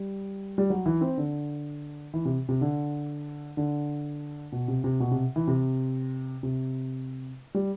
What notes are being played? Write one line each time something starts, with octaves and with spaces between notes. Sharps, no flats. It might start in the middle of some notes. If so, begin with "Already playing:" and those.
Already playing: G3
G3
F#3
E3
C4
D3
E3
C3
C3
D3
D3
B2
C3
C3
B2
C3
E3
C3
C3
G3